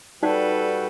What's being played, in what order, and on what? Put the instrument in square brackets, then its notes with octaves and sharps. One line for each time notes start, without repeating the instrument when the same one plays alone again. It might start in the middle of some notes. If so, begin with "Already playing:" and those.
[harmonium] G3 F#4 G5 [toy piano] D#4 D5 [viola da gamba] A4 B4